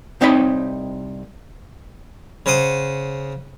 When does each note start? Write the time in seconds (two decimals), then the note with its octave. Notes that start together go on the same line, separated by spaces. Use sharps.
0.21 C2 C4 D#4 C#5 D#5 B5
2.46 C#3 C5 F#5 D#6